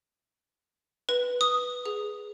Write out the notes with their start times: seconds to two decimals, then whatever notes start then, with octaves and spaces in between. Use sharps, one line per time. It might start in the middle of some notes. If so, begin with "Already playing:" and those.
1.09 B4
1.41 D#6
1.86 G#4